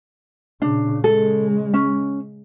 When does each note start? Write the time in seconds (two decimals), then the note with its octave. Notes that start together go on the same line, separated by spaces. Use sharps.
0.62 A#2 C#3 D4
1.04 C#3 G#3 A4
1.74 C#4